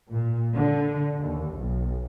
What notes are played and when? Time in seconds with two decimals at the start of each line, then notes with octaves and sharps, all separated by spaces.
0.10 A#2
0.54 D3
1.20 D#2
1.56 B1